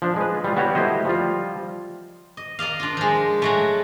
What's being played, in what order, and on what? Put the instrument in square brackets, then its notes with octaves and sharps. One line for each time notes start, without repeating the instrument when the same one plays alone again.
[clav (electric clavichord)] F3 D4
G#3 B4
G3 F4
G3 B3 F#4 G4 C#5
A3 E4 G4 C5 D#5
F3 G3 F4
[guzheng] D#5
A#4 D5 D#5 F5
D4 F4
F3 G#3
F#3 G#3 A3